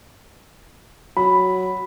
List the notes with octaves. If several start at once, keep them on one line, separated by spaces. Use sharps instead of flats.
F#3 B5